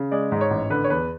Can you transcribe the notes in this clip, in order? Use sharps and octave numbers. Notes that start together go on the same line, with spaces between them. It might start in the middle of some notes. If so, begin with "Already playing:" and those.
Already playing: C#3
G#3 D5
G#2
C#5
A1
D3 B4
C#5
E2 B4